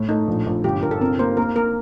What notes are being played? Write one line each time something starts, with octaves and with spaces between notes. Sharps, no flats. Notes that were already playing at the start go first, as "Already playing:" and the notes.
Already playing: A2
A3 D#4
A#1
A#1
G1 G4
G1 A#4
A4
C3 A#4
A#3 C5
A#3 A#4
A#3 A#4